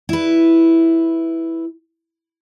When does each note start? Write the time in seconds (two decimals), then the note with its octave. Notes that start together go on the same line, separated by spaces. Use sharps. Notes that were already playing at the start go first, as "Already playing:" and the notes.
0.09 E4 B4